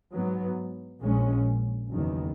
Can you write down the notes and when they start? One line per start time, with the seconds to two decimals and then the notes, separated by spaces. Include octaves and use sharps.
0.12 G#2 F#3 B3
1.01 A#1 A#2 G#3 C#4
1.88 F#1 E2 D#3